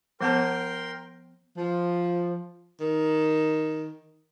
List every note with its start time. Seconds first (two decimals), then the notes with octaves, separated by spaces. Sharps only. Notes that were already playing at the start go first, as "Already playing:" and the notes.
0.21 F3 B3 A#4 G5 A5 C6
1.57 F3
2.81 D#3